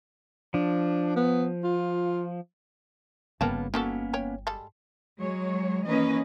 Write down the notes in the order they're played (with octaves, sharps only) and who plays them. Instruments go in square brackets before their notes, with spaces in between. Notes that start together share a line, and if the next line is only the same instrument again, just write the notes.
[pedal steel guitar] F3 [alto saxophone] D4
[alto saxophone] B3
F4
[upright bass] G1 [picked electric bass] C#3 A#3 B3 [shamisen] A#4 G5 A5
[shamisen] D#3 F#4 A4 [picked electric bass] A#3 B3 C#4
[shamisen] C#5 G5 G#5
G3 G#3 A4
[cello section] F#3 G#3 C#5
D#3 E3 A#3 C#4 B4 D#5